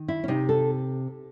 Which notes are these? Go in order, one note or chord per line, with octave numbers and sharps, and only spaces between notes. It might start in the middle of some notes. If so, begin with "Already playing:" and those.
Already playing: D#3
E4
C#4
C3 D#4
A4